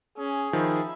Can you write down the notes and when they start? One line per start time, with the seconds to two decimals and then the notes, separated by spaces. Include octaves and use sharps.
0.18 C#4 G#4
0.53 D#3 F3 E5 B5